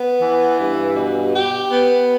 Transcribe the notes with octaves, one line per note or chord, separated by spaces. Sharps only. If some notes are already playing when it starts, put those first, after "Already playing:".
Already playing: B3
E3
G2
B2
G4
B3